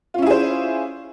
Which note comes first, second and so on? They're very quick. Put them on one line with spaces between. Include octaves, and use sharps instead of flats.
F4 C#4 E4 G#4 C5